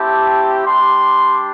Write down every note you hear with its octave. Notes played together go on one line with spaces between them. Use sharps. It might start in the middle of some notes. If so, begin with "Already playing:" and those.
Already playing: A3 C4 E4 G4 A5
G3 D4 G4 C6